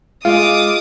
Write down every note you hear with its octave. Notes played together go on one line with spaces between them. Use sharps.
G#3 F4 D6 D#6